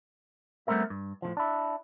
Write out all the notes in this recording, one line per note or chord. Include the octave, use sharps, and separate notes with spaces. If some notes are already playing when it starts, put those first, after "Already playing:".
G3 A3 B3 C4 A#4 E5
G2
A2 C#3 F3
D4 E4